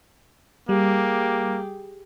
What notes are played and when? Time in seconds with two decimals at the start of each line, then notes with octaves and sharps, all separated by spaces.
0.69 G3 A#3 G4 G#4